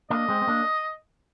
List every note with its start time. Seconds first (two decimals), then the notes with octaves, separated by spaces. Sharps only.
0.10 A#3 D4 D#5
0.29 G#3 C4
0.42 C4
0.47 A#3 D4